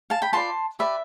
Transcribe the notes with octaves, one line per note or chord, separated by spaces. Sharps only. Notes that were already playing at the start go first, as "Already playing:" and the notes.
F5 A5
G5 B5
F4 B4 D5 A5 C6
G4 B4 D5 E5